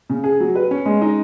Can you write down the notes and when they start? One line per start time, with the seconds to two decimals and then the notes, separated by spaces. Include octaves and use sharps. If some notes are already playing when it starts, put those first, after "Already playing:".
0.10 C#3
0.24 G#4
0.40 F#3
0.55 B4
0.71 C#4
0.86 G#3
1.02 D#4